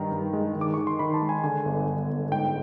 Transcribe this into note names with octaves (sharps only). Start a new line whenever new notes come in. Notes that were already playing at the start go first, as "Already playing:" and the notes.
Already playing: G2 D#3 A#5
G2
G#3
D#3
D6
D#3 C#6
C6
D#3 B5
A5
G#3
G#5
D3 G#5
G1
G1
G1
G#2 G5